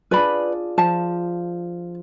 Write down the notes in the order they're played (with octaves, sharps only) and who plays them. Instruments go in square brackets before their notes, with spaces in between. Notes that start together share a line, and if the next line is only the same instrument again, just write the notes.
[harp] D4 F4 G#4 [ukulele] B4 D5 B5
[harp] F3 [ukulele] A5